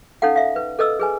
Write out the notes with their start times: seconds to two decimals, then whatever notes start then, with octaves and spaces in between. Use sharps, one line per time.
0.22 C#4 D#4 A4 F5 F#5
0.36 E5 F5
0.56 B4
0.79 A4 B4 D#5 E6
0.99 G#4 B4 G#5